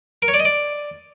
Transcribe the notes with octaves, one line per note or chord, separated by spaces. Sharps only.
A#4
C#5
D5
D#5
D5